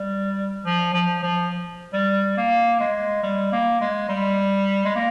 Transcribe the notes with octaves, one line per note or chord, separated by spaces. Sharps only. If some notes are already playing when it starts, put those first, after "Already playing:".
Already playing: G3
F3
F3
F3
G3
A#3
G#3
G3
A#3
G#3
G3
G#3
A#3